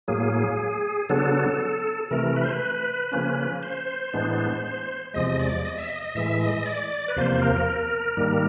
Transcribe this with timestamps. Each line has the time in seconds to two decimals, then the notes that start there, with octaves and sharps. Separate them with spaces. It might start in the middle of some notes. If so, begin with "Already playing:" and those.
0.08 A2 F#3 A#3 G#4
0.34 G#4
1.09 C#3 F#3 B3 D4 A4
2.11 C3 E3 A3 A#4
2.36 B4
2.43 C5
2.51 B4
3.12 C#3 F3 A#3 C#4
3.63 C5
4.13 A2 E3 G#3 B3 D4
5.14 E2 C3 F3 G#3 D#5
5.39 D5
5.65 D#5
5.77 E5
5.90 D#5
6.02 D#5
6.15 A2 E3 G#3 E5
6.41 D#5
6.66 D5
7.08 B4
7.16 E2 C3 F3 A#3 C5
7.42 A#4
8.17 G#2 D#3 G3 A#3